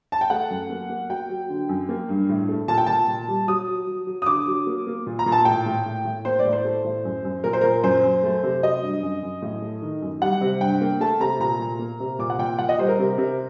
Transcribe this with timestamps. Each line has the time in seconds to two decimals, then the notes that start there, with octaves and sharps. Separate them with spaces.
0.12 A5
0.21 G5
0.30 A3 F#5
0.50 F#2
0.70 A#3
0.90 A#3
1.10 F#3 G5
1.29 F#3
1.50 D3
1.69 F#2
1.89 A#3
2.09 G2
2.29 A2
2.49 A3
2.68 A#2 A5
2.78 G5
2.87 A#2 A5
3.08 A#2
3.28 G3
3.47 F#3 D#6
3.68 F#3
3.87 F#3
4.07 F#3
4.22 D#6
4.26 D3 D6
4.47 F#3
4.67 A#3
4.87 A#3
5.07 A#2
5.19 A#5
5.26 A#2
5.32 A5
5.45 A2 G5
5.66 A2
5.86 A2
6.05 A2
6.25 A#3 C5
6.39 D5
6.45 A2
6.53 C5
6.65 A3
6.84 A2
7.05 F#2
7.25 F#2
7.44 A#2 A#4
7.53 C5
7.61 A#2 A#4
7.83 F#2 C5
8.03 F#2
8.24 A3
8.43 C3
8.62 F#3 D#5
8.82 G2
9.03 F#2
9.23 F#2
9.42 A2
9.62 A3
9.82 D#3
10.02 F#2
10.22 G3 F#5
10.41 C3
10.61 G2 G5
10.81 A#3
11.01 A3 A5
11.20 C3 A#5
11.40 A#2 A#5
11.59 A#2
11.79 A#3
12.00 C3
12.19 A#2 D6
12.30 F#5
12.39 A#2 G5
12.59 A#2 F#5
12.69 D#5
12.78 G3 C5
12.88 A#4
12.99 C3
13.18 C3